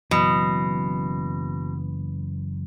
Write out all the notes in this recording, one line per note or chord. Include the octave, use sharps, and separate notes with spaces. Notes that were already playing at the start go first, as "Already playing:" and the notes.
F#1 F#2 B2 E3